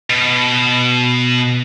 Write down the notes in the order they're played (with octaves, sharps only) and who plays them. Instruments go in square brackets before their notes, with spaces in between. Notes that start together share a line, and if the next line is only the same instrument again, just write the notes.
[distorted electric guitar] B2